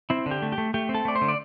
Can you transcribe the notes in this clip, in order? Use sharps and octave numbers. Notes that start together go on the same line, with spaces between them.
C4 E4
D3
G4
A3
G4
A3
A3 G4
C4
A4
A3 D5
C5
D3
D5